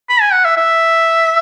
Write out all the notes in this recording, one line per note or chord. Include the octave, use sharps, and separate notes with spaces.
B5
G#5
F#5
E5
E5